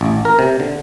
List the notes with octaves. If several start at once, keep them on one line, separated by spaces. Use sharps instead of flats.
A1
A#4
C3
D3